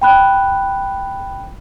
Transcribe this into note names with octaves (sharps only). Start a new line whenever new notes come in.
G5 B5 F#6